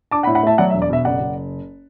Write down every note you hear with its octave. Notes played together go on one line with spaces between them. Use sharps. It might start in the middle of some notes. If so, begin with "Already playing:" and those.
D4 A5 D6
F#5 B5
A2
F#5 B5
A3 E5 A5
F#3 D5 F#5
E5
E1
D5
B2 E5
F#1 D5 F#5
F#1